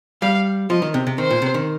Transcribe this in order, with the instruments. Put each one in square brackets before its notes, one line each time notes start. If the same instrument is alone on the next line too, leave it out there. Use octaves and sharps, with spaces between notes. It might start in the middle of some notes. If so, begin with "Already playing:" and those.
[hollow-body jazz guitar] G3 [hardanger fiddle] F5
[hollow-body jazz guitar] F3 [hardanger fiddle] D#5
[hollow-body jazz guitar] D#3
C3
C3
[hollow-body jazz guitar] D#3 [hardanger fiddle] C5
[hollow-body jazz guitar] A#2
C3
D#3